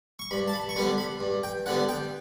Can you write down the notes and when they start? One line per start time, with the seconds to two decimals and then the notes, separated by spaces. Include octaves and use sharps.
0.19 C#6
0.31 G2 B5
0.48 A5
0.53 B5
0.69 C#6
0.76 D3 G3 B3 B5
0.98 B5
1.20 G2
1.43 G5
1.66 D3 G3 B3 F#5
1.89 G5